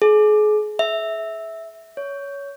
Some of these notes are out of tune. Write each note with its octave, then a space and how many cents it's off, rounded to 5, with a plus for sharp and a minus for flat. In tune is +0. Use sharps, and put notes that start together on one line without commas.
G#4 +35
E5 -10
C#5 +20